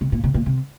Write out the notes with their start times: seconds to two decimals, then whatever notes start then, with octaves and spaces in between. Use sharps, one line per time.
0.01 C3
0.12 A#2
0.24 C3
0.34 A#2
0.46 C3